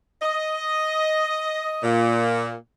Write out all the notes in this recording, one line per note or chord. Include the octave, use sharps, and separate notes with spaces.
D#5
A#2